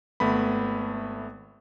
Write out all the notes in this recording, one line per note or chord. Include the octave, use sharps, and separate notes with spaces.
G#1 A3 B3 B5